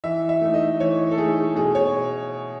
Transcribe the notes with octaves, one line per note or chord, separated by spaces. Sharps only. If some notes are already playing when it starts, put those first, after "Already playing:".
E3 E5
E5
A3 D#4
D#5
E3 C#5
A4
A3 D#4 G#4
B2 G#4
C#5